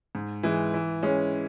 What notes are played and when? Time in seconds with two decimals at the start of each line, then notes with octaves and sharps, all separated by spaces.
0.15 G#2
0.43 E3 G#3
0.74 E3
1.03 G#3 C#4